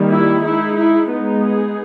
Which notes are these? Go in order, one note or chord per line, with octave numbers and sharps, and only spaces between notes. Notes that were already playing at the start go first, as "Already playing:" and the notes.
Already playing: D#3 G3 A#3
E4
G#3 D#4 E4
E4
G#3 B3 D#4
G#4